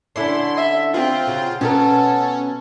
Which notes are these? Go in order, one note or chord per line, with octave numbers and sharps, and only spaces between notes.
D3 C#4 D4 E4 C6
E5
C4 F4
C#3 F#3
B2 F#3 C#4 A4 A#4